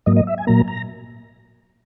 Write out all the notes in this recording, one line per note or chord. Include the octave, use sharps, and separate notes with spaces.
G#2 F#3 A#3 D#5
D#5
E5
G#5
A#2 F#3 A#3 A#5
A#5